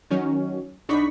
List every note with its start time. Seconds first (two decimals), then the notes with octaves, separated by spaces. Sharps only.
0.10 D#3 F#3 C#4
0.89 B1 D4 D#4 B5 C#6 B6